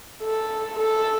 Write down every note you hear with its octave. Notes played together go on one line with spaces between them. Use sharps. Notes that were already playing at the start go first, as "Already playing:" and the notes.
A4
A4